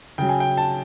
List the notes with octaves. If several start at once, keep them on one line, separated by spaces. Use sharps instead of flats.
C#3 F#3 G5
G#5
G5
A5